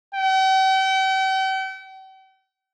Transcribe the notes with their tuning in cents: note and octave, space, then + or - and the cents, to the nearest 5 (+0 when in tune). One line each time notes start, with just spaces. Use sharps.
G5 -45